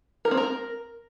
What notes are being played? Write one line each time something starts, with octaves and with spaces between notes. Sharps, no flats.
A#4
C4
A#4